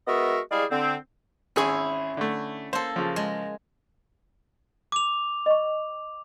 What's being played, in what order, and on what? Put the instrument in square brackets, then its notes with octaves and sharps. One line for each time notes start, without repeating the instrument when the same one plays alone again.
[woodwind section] G#3 B3 F#4 A#4 D#5 E5
G3 G#3 E4 G#4 D5 F5
D3 C4
[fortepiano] G#1 G#4 [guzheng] C#4 E4
[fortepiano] D3 A3
[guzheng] A#3 A4 [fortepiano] C5
[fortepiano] C#3 F3
[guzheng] G#3
[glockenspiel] D6 F7
[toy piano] D#5 C#6